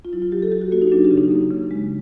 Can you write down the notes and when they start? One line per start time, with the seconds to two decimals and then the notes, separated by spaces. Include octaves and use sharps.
0.05 F4
0.13 F#3 E4
0.22 F4
0.32 F#3 G4
0.42 A4
0.52 F#3 G4
0.61 F#4
0.72 A#3 F#4
0.82 D#4
0.92 F#3 D4
1.04 G4
1.11 C#3
1.17 D#4
1.31 A#3
1.51 C#3
1.71 G#3